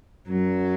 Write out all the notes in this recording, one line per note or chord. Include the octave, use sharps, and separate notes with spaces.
F#2 F#3